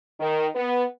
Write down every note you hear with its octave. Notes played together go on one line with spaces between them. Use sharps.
D#3
B3